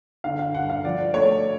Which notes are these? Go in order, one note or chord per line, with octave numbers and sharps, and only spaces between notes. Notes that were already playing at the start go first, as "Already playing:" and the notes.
D3 F5
F5
G2 F#5
F5
F3 D5
A3 C#5